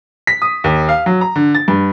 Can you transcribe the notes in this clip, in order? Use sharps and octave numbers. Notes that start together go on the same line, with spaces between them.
B6
D#6
D#2
F5
F#3
A#5
D3
A6
G2